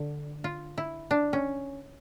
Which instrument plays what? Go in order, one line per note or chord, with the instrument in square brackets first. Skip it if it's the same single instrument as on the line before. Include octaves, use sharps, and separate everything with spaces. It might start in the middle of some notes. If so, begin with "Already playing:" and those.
Already playing: [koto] D3
F4
E4
D4
C#4